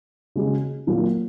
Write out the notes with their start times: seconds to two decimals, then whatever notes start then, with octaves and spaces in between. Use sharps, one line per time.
0.36 C#3 G#3 F#4
0.87 A#2 F#3 A#3 F#4